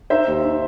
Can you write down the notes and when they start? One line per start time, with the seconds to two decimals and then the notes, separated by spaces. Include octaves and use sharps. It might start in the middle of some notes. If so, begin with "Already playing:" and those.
0.10 D#4 C5 E5
0.28 D#2
0.44 D#4